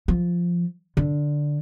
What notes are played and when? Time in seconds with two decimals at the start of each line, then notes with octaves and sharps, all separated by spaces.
0.08 F3
0.97 D3